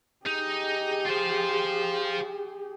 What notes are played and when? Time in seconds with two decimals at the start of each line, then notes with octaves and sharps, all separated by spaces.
0.26 D#4 G4 G#4
1.07 F4 C5